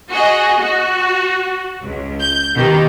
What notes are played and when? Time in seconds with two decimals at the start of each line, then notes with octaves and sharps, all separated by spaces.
0.10 F#4 G#4 D#5
0.58 F#4
1.83 C#2
2.20 G6
2.56 B2 D#3 G4